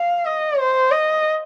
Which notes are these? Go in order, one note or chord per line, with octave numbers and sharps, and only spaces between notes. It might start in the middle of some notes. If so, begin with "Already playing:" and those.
Already playing: F5
D#5
C5
D#5